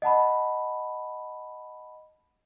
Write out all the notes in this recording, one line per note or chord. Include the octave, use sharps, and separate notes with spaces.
D#5 F#5 A5 B5